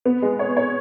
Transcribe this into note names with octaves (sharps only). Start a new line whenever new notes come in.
B3
G#3
C#5
C#5